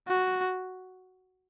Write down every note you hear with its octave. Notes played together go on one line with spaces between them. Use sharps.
F#4